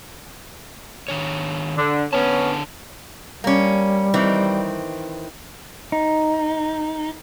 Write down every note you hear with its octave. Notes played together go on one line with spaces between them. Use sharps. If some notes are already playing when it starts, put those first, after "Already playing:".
D#3 D4 C#5
D3
D3 B3 C#4 C#5 A5
G3 A#3 C#4
D#3 E3 C4
D#4